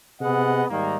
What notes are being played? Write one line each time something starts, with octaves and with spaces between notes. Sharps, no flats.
C3 B3 G#4 D#5 F#5
G#2 D#3 G3 A#3